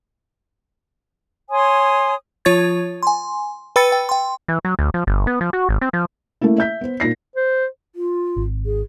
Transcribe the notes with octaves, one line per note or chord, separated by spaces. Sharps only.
C#5 G#5 C6 D#6
F3 F4 C#5 C#6 G#6 A6
G#5 C6
B4 G5 B5 E6 A6 C#7
G5
G5 C6
E3
F#3
D2
F3
G1
B3
F3
F#4
G#1
C4
F3
A3 A#3 C#4 E4
E5 G6 B6
B3 C5
A#2 D#4 A#6 C7
C5
F4
G#1
G#4